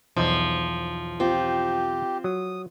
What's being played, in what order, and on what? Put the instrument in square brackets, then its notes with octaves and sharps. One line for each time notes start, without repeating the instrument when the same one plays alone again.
[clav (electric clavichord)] B1 E2 D#4 [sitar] F3
[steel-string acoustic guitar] C4 F4 [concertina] G4
[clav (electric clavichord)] F#3 [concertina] D#6